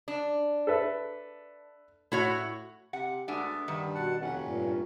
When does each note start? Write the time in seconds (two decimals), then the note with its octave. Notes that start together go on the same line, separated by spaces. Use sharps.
0.08 D4
0.67 A4 B4 E5
2.12 A2 E4 F#4 C#5
2.93 C3 F#5
3.28 D2 G#3 B3 D4 E5
3.68 G2 D#3
3.95 B2 F#5 A5
4.21 F1 C#4 F#5
4.40 G2 A#2